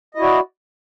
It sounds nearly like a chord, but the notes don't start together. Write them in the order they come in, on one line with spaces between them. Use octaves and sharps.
D#5 E4 F#4 D5